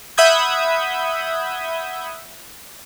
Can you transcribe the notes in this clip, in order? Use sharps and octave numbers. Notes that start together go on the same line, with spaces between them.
E5 F#5 B5 D#6 G6 G#6